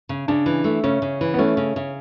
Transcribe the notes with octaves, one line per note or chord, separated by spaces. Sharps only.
C#3
C#3 D4
E3
A3
C#3 C#4
C#3
E3
B3
A3 C#4
C#3
C#3